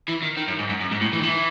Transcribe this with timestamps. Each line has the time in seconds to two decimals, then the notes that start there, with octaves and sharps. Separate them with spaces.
0.08 E3
0.22 D#3
0.37 D#3
0.48 F#2
0.59 G#2
0.69 F#2
0.81 F#2
0.91 G#2
1.01 A2
1.13 E3
1.19 D#3
1.23 E3